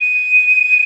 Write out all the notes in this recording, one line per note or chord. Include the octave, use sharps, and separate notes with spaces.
D#7